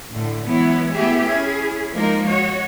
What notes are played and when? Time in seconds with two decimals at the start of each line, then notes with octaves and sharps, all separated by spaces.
0.11 A2 D3
0.45 E3 F#3 G#3 B3 E4 C#5
0.93 A3 B3 E4 G4 G#4 E5
1.26 C#4 E4 G#4
1.92 F3 G#3 A#3 D#4 A#4
2.26 F#4 C#5 D#5